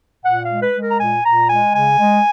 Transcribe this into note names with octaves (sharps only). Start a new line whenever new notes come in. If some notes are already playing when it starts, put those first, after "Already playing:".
A#2 F#5
F5
G#3
B4
G#3
A#4
A#5
A#2 G#5
A#2 A#5
G#3 G#5
C#3 G#5
G#3